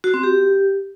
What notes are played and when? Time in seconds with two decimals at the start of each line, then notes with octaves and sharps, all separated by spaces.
0.04 F#4
0.14 C4
0.23 G4